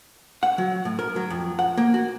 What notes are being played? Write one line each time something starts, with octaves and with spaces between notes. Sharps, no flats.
F#5
F#3
A2
A#4
F#3
F2
F#5
A#3
F#4